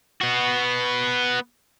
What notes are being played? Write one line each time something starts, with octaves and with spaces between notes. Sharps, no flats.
B3 F#4